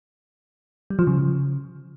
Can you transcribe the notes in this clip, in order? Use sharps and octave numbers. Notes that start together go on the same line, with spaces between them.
G3
F3
C#3